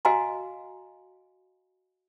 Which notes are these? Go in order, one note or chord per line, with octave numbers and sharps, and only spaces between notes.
F#4 D#5 F5 G#5 A#5 C6